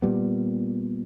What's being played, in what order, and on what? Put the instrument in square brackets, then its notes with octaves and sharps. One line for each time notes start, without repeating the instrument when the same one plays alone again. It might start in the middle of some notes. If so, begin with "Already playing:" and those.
[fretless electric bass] A#2 G3 B3